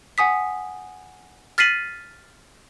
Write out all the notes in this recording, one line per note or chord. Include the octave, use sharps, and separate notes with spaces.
F#5 G#5 D#6 B6
F6 A6 B6 C7 D#7 F#7